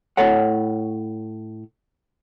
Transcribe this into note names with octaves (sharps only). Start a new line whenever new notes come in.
A2 A4 C#5 F#5